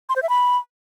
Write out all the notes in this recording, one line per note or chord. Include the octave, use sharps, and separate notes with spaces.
C6
C5
E5
B5